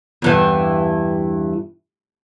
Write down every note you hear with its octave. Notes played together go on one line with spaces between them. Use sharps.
E2 G2 E3